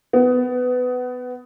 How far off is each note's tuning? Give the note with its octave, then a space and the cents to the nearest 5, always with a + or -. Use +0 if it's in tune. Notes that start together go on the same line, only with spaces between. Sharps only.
B3 +20